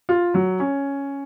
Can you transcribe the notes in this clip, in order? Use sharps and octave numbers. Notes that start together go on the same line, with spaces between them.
F4
F#3
C#4